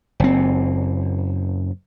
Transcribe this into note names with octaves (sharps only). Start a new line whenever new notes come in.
F#1 C4